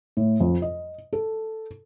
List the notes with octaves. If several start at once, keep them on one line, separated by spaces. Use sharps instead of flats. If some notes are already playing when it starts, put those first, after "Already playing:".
A2
F2
D#5
A4